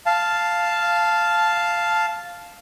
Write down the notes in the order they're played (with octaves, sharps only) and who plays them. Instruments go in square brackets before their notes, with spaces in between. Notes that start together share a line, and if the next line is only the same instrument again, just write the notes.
[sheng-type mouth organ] F5 A5